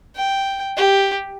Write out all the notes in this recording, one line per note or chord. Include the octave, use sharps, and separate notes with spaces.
G5
G4